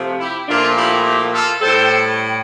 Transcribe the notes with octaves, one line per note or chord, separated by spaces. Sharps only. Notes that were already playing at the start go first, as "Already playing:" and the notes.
Already playing: C3 F3 A3
E4 G4
A#2 F3 A3 D4 F4
E4 G4
E4 G4
F4 A4
A2 G3 A4 C5